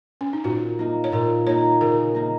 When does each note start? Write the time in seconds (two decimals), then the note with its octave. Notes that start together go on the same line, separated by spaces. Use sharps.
0.21 C#4
0.33 D#4
0.44 A#2 F#4
0.79 A#3 D#4
1.04 C#5
1.12 A#2 A#4
1.47 A#3 D#4 C#5
1.81 C#3 A#4
2.14 A#3 D#4